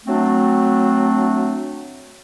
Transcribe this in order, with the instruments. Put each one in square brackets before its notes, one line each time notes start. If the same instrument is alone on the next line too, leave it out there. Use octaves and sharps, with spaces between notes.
[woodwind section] F#3 A3 C4 D4